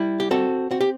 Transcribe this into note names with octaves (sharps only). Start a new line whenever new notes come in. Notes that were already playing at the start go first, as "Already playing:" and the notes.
Already playing: G3 E4
G4
C4 F#4 A4
C4 F#4
G4